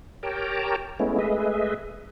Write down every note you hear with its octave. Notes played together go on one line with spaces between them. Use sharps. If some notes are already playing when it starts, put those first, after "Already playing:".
G4 A#4 C#5 G5 A5 A#5
G#3 A3 B3 C#4 E4
G#3 A3 G#4 B4 D#5 E5